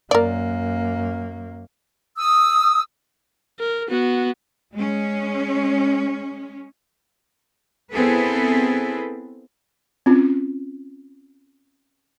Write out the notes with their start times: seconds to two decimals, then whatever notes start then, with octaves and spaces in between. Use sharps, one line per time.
0.11 F#2 A#3 A#4 D5
2.18 D#6 E6
3.60 A#4
3.89 B3 F#4
4.74 G#3 C#4
7.92 B3 C4 E4 G#4 A4 B4
10.06 C4 C#4 F4